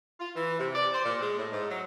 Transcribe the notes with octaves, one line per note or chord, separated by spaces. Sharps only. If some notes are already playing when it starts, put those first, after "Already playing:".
F4
E3
C3
D5
C5
A#2
G#3
A2
G#2
F#3